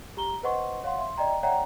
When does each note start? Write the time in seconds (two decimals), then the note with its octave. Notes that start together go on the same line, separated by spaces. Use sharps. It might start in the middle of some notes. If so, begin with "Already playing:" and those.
0.17 G4 A#5 G7
0.43 B4 C5 D#5 F#5 C6 C#6
0.84 C#5 F5 F#5 C6
0.98 E5 C6
1.18 D5 D#5 G5 A#5
1.43 C#5 D5 E5 F#5 G5 A#5